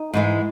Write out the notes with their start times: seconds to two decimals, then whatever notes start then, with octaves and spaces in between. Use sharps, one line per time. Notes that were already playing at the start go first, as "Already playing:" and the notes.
Already playing: D#4
0.13 G#2 E3 G#3